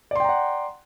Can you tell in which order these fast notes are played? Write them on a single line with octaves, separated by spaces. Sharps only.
D5 C6 G5 A#5 F#5